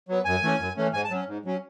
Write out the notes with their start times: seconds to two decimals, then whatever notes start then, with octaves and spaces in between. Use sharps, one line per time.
0.09 F#3 B3
0.25 F#2 G#5
0.43 E3 A3 C#4
0.59 F#2
0.77 E3 A3 C#4
0.93 G#2 G#5
1.04 A5
1.11 F#3 C#4
1.28 G#2
1.45 F#3 C#4